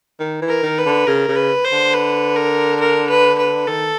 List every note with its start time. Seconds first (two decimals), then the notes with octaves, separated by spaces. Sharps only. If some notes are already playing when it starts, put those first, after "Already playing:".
0.20 D#3
0.42 E3
0.49 A#4
0.63 D#3
0.78 B4
0.85 D3
1.07 C#3 A#4
1.28 C#3
1.36 B4
1.65 C5
1.72 D3
1.94 B4
2.36 A#4
2.80 A#4
3.10 B4
3.38 B4
3.67 D#3 A4